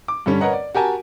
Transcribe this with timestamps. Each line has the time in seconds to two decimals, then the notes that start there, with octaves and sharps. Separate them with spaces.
0.08 D6
0.26 G2 D3 G3 C#4
0.40 A#4 B4 C#5 D#5 F#5 A#5
0.53 D5
0.75 F#4 G4 A#4 G#5 A5